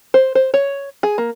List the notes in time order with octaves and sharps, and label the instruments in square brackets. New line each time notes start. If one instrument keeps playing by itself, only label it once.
[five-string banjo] C5
C5
C#5
G#4
A#3